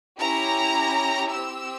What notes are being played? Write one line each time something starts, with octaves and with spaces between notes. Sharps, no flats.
C#4 E4 G4 A#5
C4 G4 E6